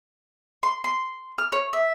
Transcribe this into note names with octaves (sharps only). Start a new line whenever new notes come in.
C6
C6
F6
C#5
E5